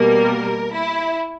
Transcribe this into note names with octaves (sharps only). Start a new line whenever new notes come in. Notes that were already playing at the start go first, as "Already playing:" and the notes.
Already playing: B2 G3 A#3 A#4
E4